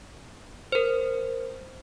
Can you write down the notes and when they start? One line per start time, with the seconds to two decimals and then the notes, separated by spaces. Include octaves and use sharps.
0.72 A#4 C5